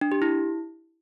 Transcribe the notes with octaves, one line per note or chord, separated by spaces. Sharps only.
D4
G4
E4